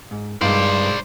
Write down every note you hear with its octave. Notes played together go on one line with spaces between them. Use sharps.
G#2
G2 G#3 D#4 F4 C5 D5